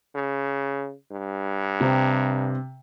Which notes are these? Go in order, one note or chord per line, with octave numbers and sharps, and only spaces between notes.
C#3
G2
C3 C4